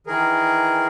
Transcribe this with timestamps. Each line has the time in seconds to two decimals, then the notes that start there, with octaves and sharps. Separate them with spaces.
0.07 D#3 E3 G#4 A#4